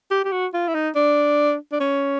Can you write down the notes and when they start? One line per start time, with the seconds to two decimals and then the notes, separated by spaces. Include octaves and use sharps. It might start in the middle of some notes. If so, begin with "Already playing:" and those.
0.11 G4
0.24 G4
0.32 F#4
0.54 F4
0.68 E4
0.74 D#4
0.95 D4
1.72 D4
1.80 C#4